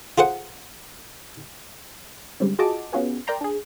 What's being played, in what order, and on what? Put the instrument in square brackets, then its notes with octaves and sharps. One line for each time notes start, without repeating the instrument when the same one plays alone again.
[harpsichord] F4 G#4 C5 F#5
[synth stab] D3 G3 G#3 C4 C#4
F4 F#4 G#4 D#5 A5 D6
B3 C#4 F4 F#4 G#4 B4
A#4 D5 G5 A#5 C6
D4 G#4